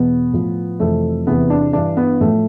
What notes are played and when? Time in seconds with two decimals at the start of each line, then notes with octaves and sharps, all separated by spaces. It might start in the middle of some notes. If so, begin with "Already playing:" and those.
Already playing: E2 B2 B3
0.33 A2 F3
0.80 F2 C3 E3 A3
1.27 E2 C3 E3 B3
1.50 D4
1.73 G2 E3 D4
1.97 B3
2.21 A2 F3 A3